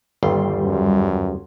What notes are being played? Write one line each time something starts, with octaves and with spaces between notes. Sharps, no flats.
G1 D#2 G3 G4 C6
F#2